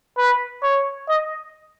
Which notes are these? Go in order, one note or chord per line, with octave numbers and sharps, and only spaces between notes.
B4
C#5
D#5